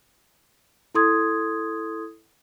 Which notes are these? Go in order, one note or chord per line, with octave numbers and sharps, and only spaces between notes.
E4 A4 C6 D#6 G#6